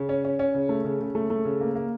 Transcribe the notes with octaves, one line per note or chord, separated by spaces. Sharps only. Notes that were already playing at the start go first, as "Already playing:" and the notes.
Already playing: C#3
C#4
C#4
C#4
C#3
A3
C#3
C#3
A3
A3
C#3
A#3
A#3